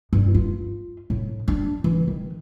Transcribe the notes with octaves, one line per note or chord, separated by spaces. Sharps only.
G2
F4
A2
D4
E3
D#3